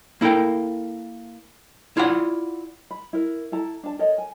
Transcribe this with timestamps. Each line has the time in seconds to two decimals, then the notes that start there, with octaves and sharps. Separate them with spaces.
0.21 A#3 E4 A4 A#4 G5
1.97 E4 F4 C#5 D5 F#5
2.91 B5
3.13 E4 A#4
3.52 E4 A4 A5 A#5
3.83 D4 A5
3.99 A4 A#4 C#5 D#5
4.18 G#5